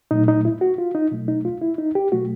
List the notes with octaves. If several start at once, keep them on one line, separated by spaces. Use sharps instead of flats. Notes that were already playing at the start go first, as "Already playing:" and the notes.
A#2 F#3 A3 D#4
D#4
E4
F#4
F4
D#4
B2 F#3 A3
D#4
F4
E4
D#4
G4
B2 F#3 A3 F#4